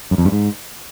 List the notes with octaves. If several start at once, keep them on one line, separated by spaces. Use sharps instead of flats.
F#2
F2
G2
G#2